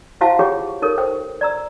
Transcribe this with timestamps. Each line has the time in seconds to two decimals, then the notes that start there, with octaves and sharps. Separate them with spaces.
0.21 E4 F#4 C5 F5 F#5 A5
0.39 F4 G4 G#4 C#5 G5
0.82 D#4 G4 A4 A#4 C#5
0.98 A#4 C5 G5
1.41 D5 A#5 E6